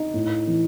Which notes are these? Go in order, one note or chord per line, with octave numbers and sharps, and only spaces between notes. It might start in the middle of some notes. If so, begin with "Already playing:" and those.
Already playing: D#4
A2
E3